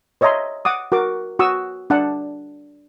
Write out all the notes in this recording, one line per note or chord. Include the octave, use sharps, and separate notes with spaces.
C5 C#5 D#5 E5 A#5 C6
F#5 D6 D#6
F#4 A#4 D6
F#4 C#6 D#6 E6
D4 F#5 A5